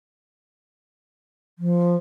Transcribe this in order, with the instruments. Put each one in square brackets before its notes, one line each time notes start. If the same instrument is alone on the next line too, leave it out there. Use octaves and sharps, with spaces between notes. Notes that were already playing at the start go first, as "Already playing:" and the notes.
[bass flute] F3